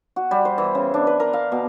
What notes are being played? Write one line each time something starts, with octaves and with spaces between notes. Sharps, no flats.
F#4
G3
C5
E3
C#3
D4
B4
A#4
F5
B2